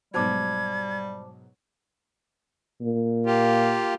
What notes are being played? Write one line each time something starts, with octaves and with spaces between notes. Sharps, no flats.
G#2 B2 F#3 G3 C5 A5 D6 G#6
A#2
A#3 F4 G4